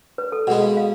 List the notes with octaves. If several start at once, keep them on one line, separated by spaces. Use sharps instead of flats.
B4
A4
B2 G#3 B3 F#5
F5
F5